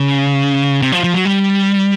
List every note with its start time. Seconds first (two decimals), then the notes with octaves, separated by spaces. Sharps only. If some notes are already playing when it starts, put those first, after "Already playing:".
Already playing: C#3
0.82 C3
0.92 F3
1.04 F3
1.14 F#3
1.25 G3